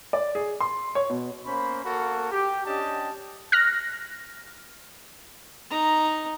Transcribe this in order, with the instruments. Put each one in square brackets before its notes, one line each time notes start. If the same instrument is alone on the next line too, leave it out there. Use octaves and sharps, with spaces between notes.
[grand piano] D5
G#4
C6
C#5
B2
[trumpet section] A#3 C#4 C5 B5
A#3 F#4 A4 A#4
G4
C#4 D4 G4 D#5 A5
[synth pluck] F6 F#6 A#6
[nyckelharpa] D#4 A#5